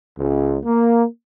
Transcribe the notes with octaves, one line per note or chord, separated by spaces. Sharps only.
C#2
A#3